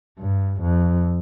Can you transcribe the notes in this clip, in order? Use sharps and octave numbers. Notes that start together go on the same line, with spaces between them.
G2
F2